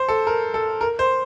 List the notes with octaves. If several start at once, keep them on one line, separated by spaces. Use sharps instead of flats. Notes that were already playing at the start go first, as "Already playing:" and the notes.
Already playing: C5
A4
A#4
A4
A#4
C5